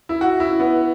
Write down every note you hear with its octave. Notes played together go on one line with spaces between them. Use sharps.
E4
F#4
E4
B3